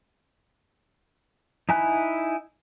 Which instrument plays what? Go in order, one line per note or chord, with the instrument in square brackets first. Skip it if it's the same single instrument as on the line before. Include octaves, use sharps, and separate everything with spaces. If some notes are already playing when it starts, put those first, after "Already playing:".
[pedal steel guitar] D#4 E4 G#5 B5 F#6